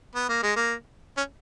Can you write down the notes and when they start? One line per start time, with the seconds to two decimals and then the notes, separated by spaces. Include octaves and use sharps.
0.15 B3
0.29 A#3
0.43 G#3
0.56 A#3
1.17 C#4